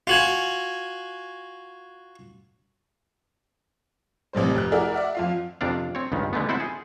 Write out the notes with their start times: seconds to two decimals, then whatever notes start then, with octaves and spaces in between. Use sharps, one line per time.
0.07 F4 F#4 G#5
4.33 A1 C3 G3 C5
4.54 F1 G4 F#6
4.72 E4 F#4 G#4 A#4 D5 E5
4.94 D5 E5 F#5
5.15 F2 F4 F5
5.61 F2 C3 D4 D5 F5
5.95 C4 C#5
6.12 C#2 G2 D#3
6.33 D3 G#3 A3 B3
6.49 C4 E4 F#4 C5 F#5 A5
6.60 G#4